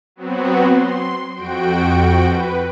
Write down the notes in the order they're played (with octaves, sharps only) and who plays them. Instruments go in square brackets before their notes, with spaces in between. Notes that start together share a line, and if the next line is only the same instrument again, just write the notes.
[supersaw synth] F#3 B3 C4 F#4
C6
F2 F#4 G5 D7
B4